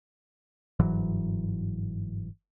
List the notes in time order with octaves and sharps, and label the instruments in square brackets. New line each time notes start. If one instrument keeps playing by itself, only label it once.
[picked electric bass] G1 G#2 E3 F#3